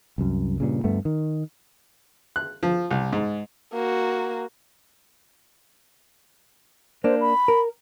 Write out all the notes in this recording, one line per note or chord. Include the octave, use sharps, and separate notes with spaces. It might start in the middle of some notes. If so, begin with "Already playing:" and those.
C2 F#2
G2 A#2 C#3
D2 G2 A3 B3
D#3
F#6
F3
C2
G#2
A#3 F#4
A#3 D4 C5
B5
A#4